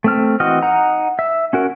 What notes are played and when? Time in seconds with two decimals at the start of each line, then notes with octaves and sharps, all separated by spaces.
0.04 A3 C4 F6
0.40 E3 C4 F#4 D#5 F6
0.62 D#4 F#5 A#5
1.19 E5
1.53 C#4 F#4 A#4